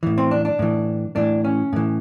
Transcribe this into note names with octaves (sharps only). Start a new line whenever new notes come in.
A2 E3
C4
D4
D4
A2 E3
A2 E3 D4
C#4
A2 E3